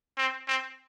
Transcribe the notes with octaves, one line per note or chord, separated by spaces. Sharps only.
C4
C4